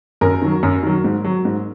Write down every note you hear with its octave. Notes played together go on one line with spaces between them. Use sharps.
F#2 A#4
D#3 F#3
F#2
D#3 F#3
G#2
F#3
G#2